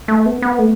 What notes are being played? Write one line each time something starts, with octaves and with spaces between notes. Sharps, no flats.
A3
B3
B3
A3